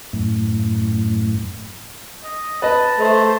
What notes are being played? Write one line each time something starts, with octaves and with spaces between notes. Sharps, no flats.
F#2 A2
D#5
B4 D#5 A5
A3 C5